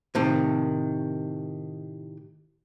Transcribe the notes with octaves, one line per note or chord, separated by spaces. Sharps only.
A2 C3 D#3